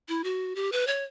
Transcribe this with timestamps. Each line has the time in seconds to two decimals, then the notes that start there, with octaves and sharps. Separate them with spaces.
0.09 E4
0.24 F#4
0.56 G4
0.72 B4
0.87 C#5